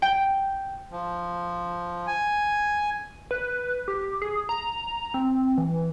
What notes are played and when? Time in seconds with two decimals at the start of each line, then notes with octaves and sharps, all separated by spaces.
0.02 G5
0.91 F3
2.07 G#5
3.31 B4
3.88 G4
4.22 G#4
4.49 A#5
5.14 C4
5.58 E3